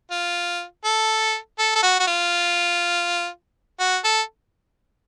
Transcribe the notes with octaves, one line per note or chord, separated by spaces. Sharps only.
F4
A4
A4
A4
F#4
F#4
F4
F#4
A4